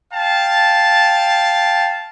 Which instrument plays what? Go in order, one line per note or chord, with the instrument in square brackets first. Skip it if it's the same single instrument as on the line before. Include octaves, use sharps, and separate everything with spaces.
[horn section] F5 G5 A5